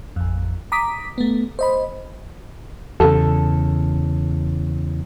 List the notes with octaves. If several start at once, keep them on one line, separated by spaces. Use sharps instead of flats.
A1 F2
A#5 D6 D#6 B6
A3 B3
C5 D#5 B5
E2 C#3 A4